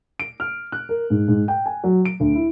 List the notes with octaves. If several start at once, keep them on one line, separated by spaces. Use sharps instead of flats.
D7
F6
F#6
A#4
G#2
G#2
G5
G#5
F#3
D7
D2
E4